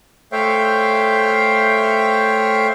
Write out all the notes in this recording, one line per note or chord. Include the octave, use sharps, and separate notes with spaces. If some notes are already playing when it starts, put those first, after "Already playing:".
A3 C5 C#5 E5 F5 G5